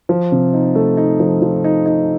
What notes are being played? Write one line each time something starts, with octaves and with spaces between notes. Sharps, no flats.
F3
C3
D#4
A3
D#4
F3
F3
D#4
D#4